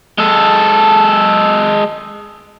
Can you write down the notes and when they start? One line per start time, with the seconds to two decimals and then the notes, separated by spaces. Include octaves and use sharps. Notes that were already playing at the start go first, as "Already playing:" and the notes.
0.18 G#3 A4